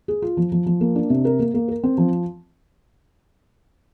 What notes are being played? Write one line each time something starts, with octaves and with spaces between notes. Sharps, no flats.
G#4
F4
F3
F3
F3
A#3
D4
C3
A#4
A#3
A#3
A#4
C4
F3